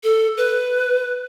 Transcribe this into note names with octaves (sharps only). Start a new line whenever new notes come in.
A4
B4